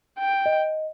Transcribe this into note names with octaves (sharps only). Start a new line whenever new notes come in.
G5
D#5